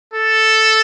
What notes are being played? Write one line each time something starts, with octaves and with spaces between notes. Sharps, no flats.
A4